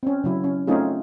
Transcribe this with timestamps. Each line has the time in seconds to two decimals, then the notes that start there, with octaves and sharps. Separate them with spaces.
0.03 C4 C#4
0.24 C#3 F#3 E4
0.44 C#4
0.67 A3 C4 C#4 D#4 F4 G#4